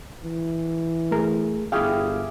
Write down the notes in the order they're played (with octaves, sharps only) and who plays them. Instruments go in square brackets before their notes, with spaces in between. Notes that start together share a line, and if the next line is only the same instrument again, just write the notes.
[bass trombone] E3
[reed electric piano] A3 G#4 A#4
[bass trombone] G1 [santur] E4 G4 G#4 [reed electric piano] F5 G5 F6